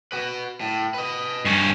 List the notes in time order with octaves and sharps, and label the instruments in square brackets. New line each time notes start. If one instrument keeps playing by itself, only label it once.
[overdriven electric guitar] F#4 B4
A2
B4 D#5
[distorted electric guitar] G2 C#4